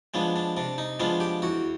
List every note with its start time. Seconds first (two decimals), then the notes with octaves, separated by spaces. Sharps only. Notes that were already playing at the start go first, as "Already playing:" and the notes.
0.14 F3 G#3 B3 D4
0.36 D4
0.57 C3 D4
0.78 D#4
1.00 F3 G#3 B3 D4 F4
1.20 G4
1.42 E2 F#4